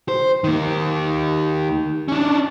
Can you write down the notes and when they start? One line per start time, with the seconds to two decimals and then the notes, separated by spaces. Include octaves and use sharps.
0.08 C5
0.44 D#3 A#3
2.08 C#4 D4